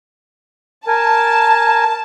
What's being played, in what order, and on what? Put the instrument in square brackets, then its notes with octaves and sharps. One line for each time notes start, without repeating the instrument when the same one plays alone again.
[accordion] A#4 G#5 [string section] A5